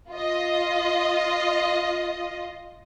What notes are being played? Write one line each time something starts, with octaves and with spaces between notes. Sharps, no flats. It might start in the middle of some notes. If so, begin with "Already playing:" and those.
F4 D#5